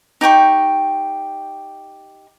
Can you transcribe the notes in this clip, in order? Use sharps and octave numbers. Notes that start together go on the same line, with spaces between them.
D#4 G4 G5 C#6